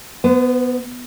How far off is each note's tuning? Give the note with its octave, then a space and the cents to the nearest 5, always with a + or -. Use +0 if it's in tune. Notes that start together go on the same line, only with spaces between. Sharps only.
B3 +0 C5 -45